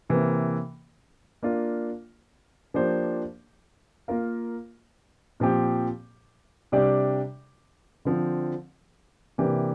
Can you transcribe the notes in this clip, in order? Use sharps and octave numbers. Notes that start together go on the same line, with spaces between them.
C3 E3 A#3
A#3 D4 F4
F3 A#3 D4 G4 C5
A#3 F4 A#4 F5
A#2 F3 C4 G4
C3 G3 D4 G4 D5
D3 F3 C4
C3 E3 A#3 D4 G4